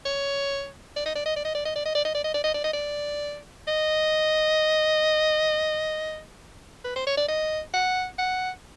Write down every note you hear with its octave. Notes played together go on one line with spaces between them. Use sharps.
C#5
D5
D#5
D5
D#5
D5
D#5
D5
D#5
D5
D#5
D5
D#5
D5
D#5
D5
D#5
D5
D#5
D5
D#5
B4
C5
C#5
D5
D#5
F#5
F#5